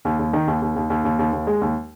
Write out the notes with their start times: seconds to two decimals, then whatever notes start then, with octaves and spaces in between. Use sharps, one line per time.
0.05 D#2
0.19 D#2
0.33 D#3
0.47 D#2
0.61 D#2
0.76 D#2
0.90 D#2
1.04 D#2
1.19 D#2
1.33 D#2
1.47 G#3
1.61 D#2